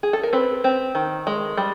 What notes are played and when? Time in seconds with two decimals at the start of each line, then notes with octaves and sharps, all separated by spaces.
0.03 G#4
0.13 A4
0.23 A#4
0.33 C4 B4
0.64 C4
0.95 D#3
1.27 G#3
1.57 G3